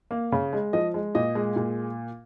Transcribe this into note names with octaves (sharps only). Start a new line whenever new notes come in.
A#3
C#3
G#3
F3 D#5
G#3
A#2 D#5
G#3
A#2